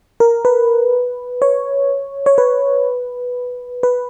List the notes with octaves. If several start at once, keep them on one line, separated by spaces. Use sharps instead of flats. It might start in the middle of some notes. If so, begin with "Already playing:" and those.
A#4
B4
C#5
C#5
B4
B4